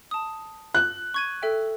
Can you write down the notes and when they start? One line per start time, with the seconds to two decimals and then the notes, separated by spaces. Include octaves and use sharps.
0.11 A5 D#6
0.74 F#6
1.14 C#6 G#6 D#7
1.42 A4 E5 G5